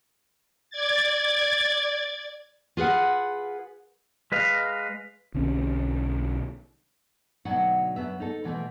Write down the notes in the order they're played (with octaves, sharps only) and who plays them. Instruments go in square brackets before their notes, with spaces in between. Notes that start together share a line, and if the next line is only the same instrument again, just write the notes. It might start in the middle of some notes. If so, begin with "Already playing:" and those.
[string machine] D5 G#6 A6
[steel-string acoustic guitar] F4 G#4 B4 F#5
[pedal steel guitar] G#3 B4 D#5 F5
[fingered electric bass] B1 D3 C4 C#4
[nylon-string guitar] D2 B2 F#3 D#4 F#5 A5
F#2 B3 E5
D#4 A4
B2 E3 F3 A3